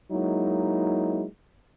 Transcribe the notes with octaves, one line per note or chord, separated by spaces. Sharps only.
F#3 G#3 A#3 D#4 E4